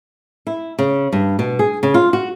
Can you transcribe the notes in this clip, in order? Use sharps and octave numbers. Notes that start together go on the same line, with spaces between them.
E4
C#3
G2
B2
G#4
C#3
F4
F#4